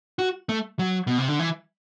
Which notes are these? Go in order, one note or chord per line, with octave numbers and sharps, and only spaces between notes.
F#4
A3
F#3
B2
C3
D3
E3